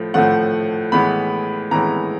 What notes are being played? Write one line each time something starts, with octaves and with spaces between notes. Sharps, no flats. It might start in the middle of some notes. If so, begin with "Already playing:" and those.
Already playing: A2 F3 A3
A2 F3 A3 F#5
A2 E3 G#3 B3 B5
A2 E3 G#3 B3 A#5